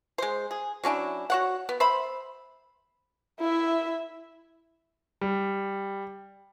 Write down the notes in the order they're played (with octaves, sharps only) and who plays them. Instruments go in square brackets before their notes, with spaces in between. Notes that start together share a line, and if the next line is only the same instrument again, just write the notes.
[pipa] G#3 C5
G#4
F#3 C#4 D4 E4
F#4 C#5 F#5
B3
C5 E5 B5
[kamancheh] E4 E5
[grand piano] G3